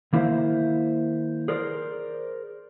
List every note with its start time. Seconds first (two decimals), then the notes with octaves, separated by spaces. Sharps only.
0.13 D#3 A#3 E4 A#4 C5 E5
1.48 G#4 A#4 C5 D5